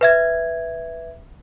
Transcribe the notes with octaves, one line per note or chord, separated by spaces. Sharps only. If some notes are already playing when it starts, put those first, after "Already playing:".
B4 E5 G#6